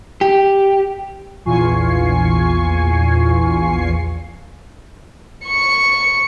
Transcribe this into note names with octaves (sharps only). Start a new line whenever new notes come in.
G4
A#1 E2 F4 G#5 C#6 C7
C#6 C#7